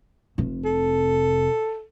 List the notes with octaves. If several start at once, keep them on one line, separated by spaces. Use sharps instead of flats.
F1 C3
A4